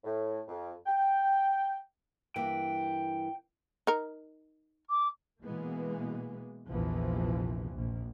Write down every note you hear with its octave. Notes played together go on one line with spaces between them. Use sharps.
A2
F2
G5
G2 E3 A#3 G5
D#4 A#4
D6
B2 E3 G#3 A#3 B3
A#1 E2 C3 E3 F3
A#1